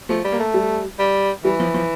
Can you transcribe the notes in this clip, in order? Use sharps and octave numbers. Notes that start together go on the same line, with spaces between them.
F3 A3
G3
A#3
A3
G3
G3
E3 G3
F3
F3